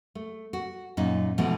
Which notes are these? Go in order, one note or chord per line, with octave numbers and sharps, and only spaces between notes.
A3
F#4
F#2 A#2 D#4
G#2 B2 E3 F3 A3